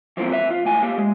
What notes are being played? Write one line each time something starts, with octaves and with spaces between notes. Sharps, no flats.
E3 F3 G#3 A#3 C4
E3 B4 E5
F4
C#2 A2 G#5
A#3 G4
G#3